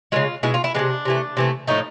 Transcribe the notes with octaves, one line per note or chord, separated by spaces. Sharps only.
C#3 E3 G#3 F4
B2 G#3 E4
F4
E4
C3 E3 G#3 D4
C3 E3 A3
C3 E3 A3
A2 F3 A3 D#4